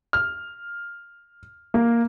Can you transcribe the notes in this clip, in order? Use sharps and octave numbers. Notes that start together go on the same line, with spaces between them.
F6
A#3